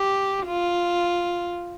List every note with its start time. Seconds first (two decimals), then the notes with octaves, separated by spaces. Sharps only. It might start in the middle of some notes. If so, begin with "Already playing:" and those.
Already playing: G4
0.47 F4